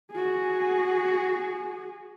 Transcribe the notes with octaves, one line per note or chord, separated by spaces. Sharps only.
F#4 G#4